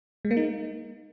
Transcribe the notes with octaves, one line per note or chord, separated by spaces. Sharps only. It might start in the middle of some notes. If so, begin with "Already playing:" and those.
G#3
A#3
D#4